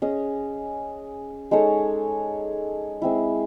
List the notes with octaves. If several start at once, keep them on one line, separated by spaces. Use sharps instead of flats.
C#4 G#4 D#5
G#3 D#4 A4 C#5
G#3 C4 E4